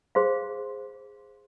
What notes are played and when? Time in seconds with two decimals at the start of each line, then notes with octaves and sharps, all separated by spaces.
0.15 G#4 C5 F5 C6